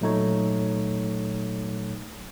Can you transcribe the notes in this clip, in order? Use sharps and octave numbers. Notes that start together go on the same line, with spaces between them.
A#2 F#3 A3 D#4 A4 C#5